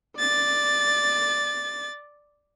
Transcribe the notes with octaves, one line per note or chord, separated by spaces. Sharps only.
D5 A6